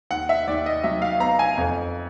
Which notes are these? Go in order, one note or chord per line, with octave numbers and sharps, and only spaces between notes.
D#2 F#5
E5
D#2 D5
D#5
F#3 E5
F5
B3 A#5
G#5
F2